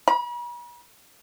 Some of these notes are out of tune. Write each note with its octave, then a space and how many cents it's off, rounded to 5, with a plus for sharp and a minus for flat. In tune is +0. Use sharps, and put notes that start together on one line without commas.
B5 -45